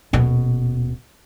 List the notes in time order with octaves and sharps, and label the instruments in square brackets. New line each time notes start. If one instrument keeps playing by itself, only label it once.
[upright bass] D#1 B2